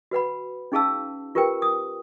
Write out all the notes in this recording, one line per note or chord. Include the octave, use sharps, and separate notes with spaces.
F#4 B4 F#5 B5
C#4 D#4 G#4 F5 A5 E6
F4 G4 A#4 B4 G5
D#6